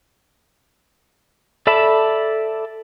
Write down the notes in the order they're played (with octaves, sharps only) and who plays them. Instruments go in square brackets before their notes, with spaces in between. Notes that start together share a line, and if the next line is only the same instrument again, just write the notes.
[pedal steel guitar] A4 D5 E5 A5 B5